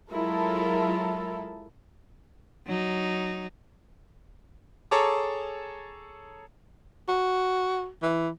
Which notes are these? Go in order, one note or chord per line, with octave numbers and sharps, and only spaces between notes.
F#3 G#3 E4 F4 A4 A#4
F#3 D#4
G#4 A4 C#5 A5 A#5 D6
F#4
E3